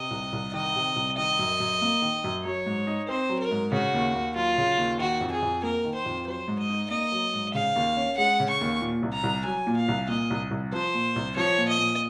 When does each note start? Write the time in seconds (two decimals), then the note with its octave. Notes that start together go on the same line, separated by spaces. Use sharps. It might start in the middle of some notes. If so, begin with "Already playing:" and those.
Already playing: C3 D#5
0.11 C2
0.33 C2
0.53 D#3 D#5
0.76 C3
0.96 C2
1.17 D#3 D#5
1.39 F#2
1.60 F#2
1.81 A#3
2.02 D#3
2.24 F#2
2.44 F#3 C#5
2.66 G#2
2.87 D#4
3.08 C4 C5
3.29 F#3
3.40 A#4
3.51 G#2
3.72 C#3 F#4
3.94 D#2
4.15 D#2
4.36 F#3 F4
4.58 C#3
4.78 D#2
4.99 D#3 F#4
5.21 F2
5.32 G#4
5.42 F2
5.63 A#3 A#4
5.85 D#3
5.95 C5
6.06 F2
6.27 F#3 C5
6.48 G#2
6.59 D#5
6.70 D#4
6.90 A#3 D#5
7.12 F#3
7.34 G#2
7.54 C#3 F5
7.76 D#2
7.97 C#4
8.17 G#3 F#5
8.40 C#3
8.50 C#6
8.61 D#2
8.81 A#2
9.03 C2
9.13 A#5
9.24 C2
9.45 F#3 G#5
9.67 A#2
9.77 F5
9.88 C2
10.08 A#2 D#5
10.30 C2
10.51 C2
10.72 F3 C5
10.94 A#2
11.16 C2
11.36 F3 C#5
11.58 A#2
11.69 D#5
11.79 A#2